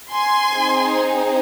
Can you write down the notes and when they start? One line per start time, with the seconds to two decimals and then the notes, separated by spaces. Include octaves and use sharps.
0.11 G#5 C6
0.52 C4 D#4 G#4